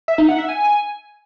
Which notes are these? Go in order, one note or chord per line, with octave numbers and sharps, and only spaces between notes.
E5
D#4
F#5
E5
G#5